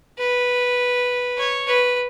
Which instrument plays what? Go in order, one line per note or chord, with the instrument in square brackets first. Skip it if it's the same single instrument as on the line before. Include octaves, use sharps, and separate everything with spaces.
[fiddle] B4
C#5
B4